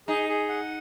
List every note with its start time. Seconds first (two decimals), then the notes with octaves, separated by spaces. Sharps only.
0.08 D#4 G#4
0.29 G#4
0.49 F#5